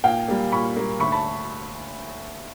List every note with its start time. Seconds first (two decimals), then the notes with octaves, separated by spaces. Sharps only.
0.04 A#2 F5 G5
0.28 G3 A#3
0.52 A#2 B5 C#6
0.76 G3 A#3
0.99 D2 B5 C#6
1.12 A5 B5